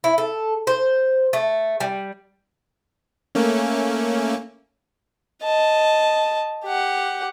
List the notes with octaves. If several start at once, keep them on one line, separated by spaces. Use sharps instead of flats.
E4
A4
C5
A3
G3
A3 A#3 C#4
D#5 A5
G4 F#5